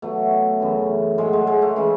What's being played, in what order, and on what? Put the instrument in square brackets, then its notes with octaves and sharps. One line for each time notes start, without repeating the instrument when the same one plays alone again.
[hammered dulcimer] B2 F#3 A3
F#2 C#3 E3
A2 F#3 G#3
G#3
G#3
A3
C#3 E3 G#3